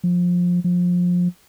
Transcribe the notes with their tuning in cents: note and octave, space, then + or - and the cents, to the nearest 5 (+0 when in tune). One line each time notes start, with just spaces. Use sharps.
F3 +20
F3 +25